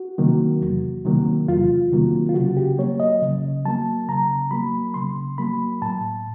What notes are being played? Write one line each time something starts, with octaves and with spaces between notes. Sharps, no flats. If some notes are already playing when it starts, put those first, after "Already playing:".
Already playing: F#4
C3 D#3 F#3 A#3
E2
C3 D#3 F#3 A#3
E2 F4
C3 D#3 F#3 A#3
F4
C#3 F#4
G4
F#3 A#3 C#5
D#5
C#3
F#3 A#3 A5
C#3 A#5
F#3 A#3 B5
C#3 C6
F#3 A#3 B5
A2 A5